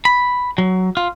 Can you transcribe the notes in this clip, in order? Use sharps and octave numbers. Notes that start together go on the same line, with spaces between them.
B5
F#3
F4